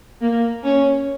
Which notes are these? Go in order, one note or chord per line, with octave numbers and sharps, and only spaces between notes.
A#3
C#4